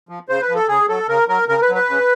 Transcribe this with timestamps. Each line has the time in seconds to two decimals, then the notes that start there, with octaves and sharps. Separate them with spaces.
0.09 F3
0.29 C#3 C5
0.42 B4
0.49 F3
0.55 A4
0.68 C#3 G#4
0.89 F#3 A4
1.08 C#3 A#4
1.28 F#3 A#4
1.48 C#3 A#4
1.62 B4
1.69 F#3
1.75 B4
1.89 C#3